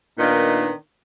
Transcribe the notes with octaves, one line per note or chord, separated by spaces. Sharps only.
A#2 D#3 A#3 B3 D4 D#4